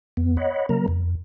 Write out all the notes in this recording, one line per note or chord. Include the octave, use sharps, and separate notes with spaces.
F2 B3
C#5 D#5 F#5 B5
C#3 F#3 A#3 A#4 A#5
F2